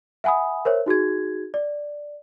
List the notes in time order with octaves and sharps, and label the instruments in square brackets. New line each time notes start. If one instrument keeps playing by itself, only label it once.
[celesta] E5 F#5 G#5 B5 D#6
A#4 C5 C#5 E5
D#4 F#4 G#4 G#6
D5